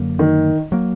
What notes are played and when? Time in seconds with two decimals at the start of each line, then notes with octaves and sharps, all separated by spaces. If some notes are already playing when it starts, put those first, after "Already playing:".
Already playing: F#2 D3 F#3 A#3
0.19 D#3
0.72 F#3 A#3